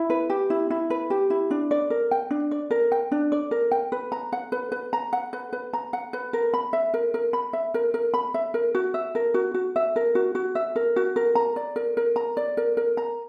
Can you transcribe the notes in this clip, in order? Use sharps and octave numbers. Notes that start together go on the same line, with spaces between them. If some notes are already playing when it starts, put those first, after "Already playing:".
Already playing: E4
B4
G4
E4
E4
B4
G4
E4
D4
D5
A#4
G5
D4
D5
A#4
G5
D4
D5
A#4
G5
B4
A#5
F#5
B4
B4
A#5
F#5
B4
B4
A#5
F#5
B4
A#4
B5
E5
A#4
A#4
B5
E5
A#4
A#4
B5
E5
A#4
F#4
E5
A#4
F#4
F#4
E5
A#4
F#4
F#4
E5
A#4
F#4
A#4
A#5
D5
A#4
A#4
A#5
D5
A#4
A#4
A#5